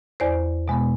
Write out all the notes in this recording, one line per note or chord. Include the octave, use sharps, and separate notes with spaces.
E2 C5 D5
B2 G#3 B3